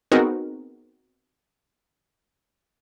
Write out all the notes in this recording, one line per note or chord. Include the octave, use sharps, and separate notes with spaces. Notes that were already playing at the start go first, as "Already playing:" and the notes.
B3 C4 D#4 F#4 G#4 A#4